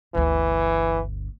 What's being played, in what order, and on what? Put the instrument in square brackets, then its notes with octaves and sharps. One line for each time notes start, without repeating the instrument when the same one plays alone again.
[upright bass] G1 D2 [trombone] E3